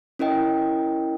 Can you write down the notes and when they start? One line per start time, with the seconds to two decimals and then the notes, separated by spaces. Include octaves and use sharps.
0.19 C#4 E4 A#4 D#5 G5